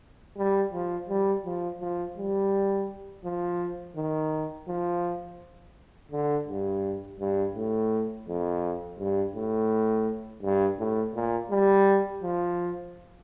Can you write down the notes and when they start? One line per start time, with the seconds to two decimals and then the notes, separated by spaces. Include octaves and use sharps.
0.37 G3
0.73 F3
1.09 G3
1.45 F3
1.81 F3
2.17 G3
3.24 F3
3.96 D#3
4.68 F3
6.11 D3
6.48 G2
7.20 G2
7.55 A2
8.27 F2
8.99 G2
9.35 A2
10.43 G2
10.79 A2
11.15 A#2
11.51 G3
12.23 F3